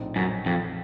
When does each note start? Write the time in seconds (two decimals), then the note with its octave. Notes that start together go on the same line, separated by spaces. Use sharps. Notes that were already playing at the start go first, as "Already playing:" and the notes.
Already playing: A#1 A2 A3 C4 D#4
0.16 F#2
0.46 F2